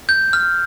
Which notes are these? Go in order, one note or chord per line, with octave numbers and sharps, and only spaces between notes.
G6
F6